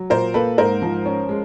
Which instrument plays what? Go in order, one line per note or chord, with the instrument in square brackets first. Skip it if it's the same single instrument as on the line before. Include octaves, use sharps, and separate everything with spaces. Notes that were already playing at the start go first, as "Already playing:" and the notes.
Already playing: [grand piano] F#3
A#2 A#4 C5
A#3 A4 B4
G#2 A#4 C5
F3
C#4
G#3